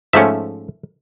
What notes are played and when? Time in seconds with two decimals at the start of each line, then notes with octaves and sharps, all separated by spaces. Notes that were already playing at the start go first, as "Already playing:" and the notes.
0.13 G#2 F3 A3 C#4 E5